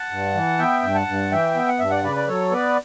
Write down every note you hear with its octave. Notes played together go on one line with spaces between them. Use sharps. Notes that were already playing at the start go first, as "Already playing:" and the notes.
Already playing: F#5 A5
G2
E3
B3 E5 G5
G2
F#5 A5
G2
E3 E5 G5
B3
F#5
G2 E5
D5 F#5
C#3 B4 D5
D5
F#3 A4 C#5
B3 B4 D5